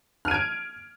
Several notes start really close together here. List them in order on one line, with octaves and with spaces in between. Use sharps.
F6 D#7 G#6 D7